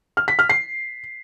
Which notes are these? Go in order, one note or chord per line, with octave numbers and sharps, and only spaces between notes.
F6
B6
F6
C7